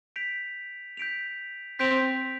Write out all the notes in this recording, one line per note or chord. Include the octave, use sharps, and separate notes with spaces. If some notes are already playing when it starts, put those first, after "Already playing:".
G6 B6 D7 F7
G6 B6 D7 F7
C4 G6 B6 D7 F7